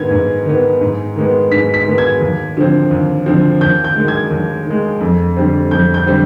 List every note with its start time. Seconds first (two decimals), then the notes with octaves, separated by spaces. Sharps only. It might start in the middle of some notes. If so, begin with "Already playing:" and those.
Already playing: G#2 D#3 B3 G#6
0.10 G#2
0.46 D#3 B3
0.81 G#2
1.16 D#3 G#3 B3
1.51 G#2 B6
1.74 B6
1.86 D#3 G#3 B3
1.98 G#6
2.21 D#2
2.57 D3 F3 C4
2.91 D#2
3.26 D3 F3 C4
3.61 D#2 G6
3.84 G6
3.96 D#3 G#3
4.08 G#6
4.31 D#2
4.66 D#3 G#3
5.01 F2
5.36 D3 G3 C4
5.71 F2 G6
5.94 G6
6.06 D3 G3 C4